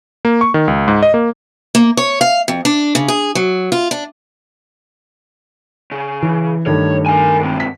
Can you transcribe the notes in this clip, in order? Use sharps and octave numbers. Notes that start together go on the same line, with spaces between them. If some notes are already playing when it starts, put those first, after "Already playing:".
A#3
C#6
D#3
C#2
G#2
D#5
A#3
A#3
C#5
F5
F2
D4
C#3
G#4
F#3
F4
D4
C#3
E3
G2 D#3 A3 C#5
A#4 G#5
G#2 C3
B6